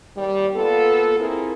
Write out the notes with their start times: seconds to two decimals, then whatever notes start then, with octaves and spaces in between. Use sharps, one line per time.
0.15 D#2 G3
0.54 A#3 B3 F4 A4
1.18 C4 E4 F4 G#4 A#4